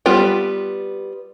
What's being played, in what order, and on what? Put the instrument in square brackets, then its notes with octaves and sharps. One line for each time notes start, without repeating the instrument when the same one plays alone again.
[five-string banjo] G3 B3 F4 G5